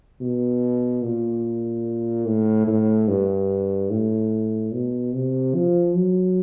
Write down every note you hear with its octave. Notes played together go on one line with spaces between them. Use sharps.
B2
A#2
A2
A2
G2
A2
B2
C3
F3
F#3